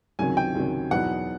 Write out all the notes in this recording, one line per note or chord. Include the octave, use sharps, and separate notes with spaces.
C#2 C3 D#3 F#3 G#5
G5
C#2 C3 D#3 F#3
E2 B2 F#3 B3 D#4 F#5